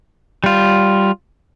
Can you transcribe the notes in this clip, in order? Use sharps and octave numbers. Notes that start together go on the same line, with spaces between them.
G3 F4